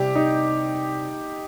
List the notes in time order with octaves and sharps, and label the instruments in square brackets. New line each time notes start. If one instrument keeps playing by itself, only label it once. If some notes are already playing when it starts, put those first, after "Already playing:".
Already playing: [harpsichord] C2 C3 G3 [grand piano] G4
[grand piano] D#4